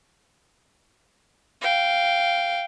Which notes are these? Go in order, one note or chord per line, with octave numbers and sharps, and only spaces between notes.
F5 G5